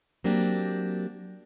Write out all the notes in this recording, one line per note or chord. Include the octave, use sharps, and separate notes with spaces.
F#3 A#3 C4 D4 G4